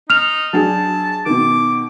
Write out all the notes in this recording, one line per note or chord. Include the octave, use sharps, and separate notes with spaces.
D#4 F6 F7
F#3 D4 G#4 A5
B2 D#3 D6